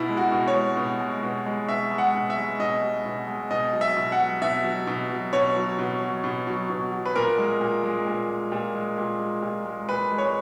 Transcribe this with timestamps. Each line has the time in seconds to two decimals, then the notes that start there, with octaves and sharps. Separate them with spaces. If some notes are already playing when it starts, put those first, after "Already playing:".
Already playing: B2 E4
0.09 G#3
0.17 F#4
0.32 B2
0.48 C#5
0.55 G#3
0.77 B2
1.01 G#3
1.23 B2
1.46 G#3
1.68 B2 E5
1.91 G#3
1.98 F#5
2.14 B2
2.30 E5
2.37 G#3
2.59 B2 D#5
2.82 G#3
3.06 B2
3.28 G#3
3.51 B2 D#5
3.73 F#3
3.81 E5
3.96 B2
4.12 F#5
4.19 F#3
4.42 B2 E5
4.64 F#3
4.87 B2
5.10 F#3
5.33 B2 C#5
5.56 F#3
5.79 B2
6.01 F#3
6.24 B2
6.47 F#3
6.70 B2
6.92 F#3
7.06 B4
7.16 A#2 A#4
7.38 G#3
7.61 A#2
7.84 G#3
8.07 A#2
8.30 G#3
8.52 A#2
8.75 G#3
8.98 A#2
9.20 G#3
9.43 A#2
9.65 G#3
9.89 A#2 B4
10.11 G#3
10.18 C#5